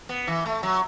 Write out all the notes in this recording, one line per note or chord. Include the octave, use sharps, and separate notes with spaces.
B3
E3
A3
F#3